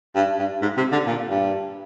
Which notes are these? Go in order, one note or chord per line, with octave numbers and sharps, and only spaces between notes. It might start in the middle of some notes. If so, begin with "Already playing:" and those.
G2
G2
G#2
C3
D3
A#2
G2